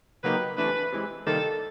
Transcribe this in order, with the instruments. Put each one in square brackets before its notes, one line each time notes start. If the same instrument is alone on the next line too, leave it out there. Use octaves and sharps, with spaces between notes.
[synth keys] C#3 F#3 A#3 D#4 G4 [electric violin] B4
[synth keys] C3 E3 A3 D4 [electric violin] B4
[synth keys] C3 E3 G#3
[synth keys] C3 D#3 G3 A#3 D#4 [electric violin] A4